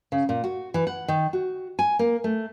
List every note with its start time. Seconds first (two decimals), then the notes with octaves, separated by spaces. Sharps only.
0.12 C#3
0.29 A#2
0.44 F#4
0.74 E3
0.87 F#5
1.08 D#3
1.33 F#4
1.79 G#5
1.99 A#3
2.24 A3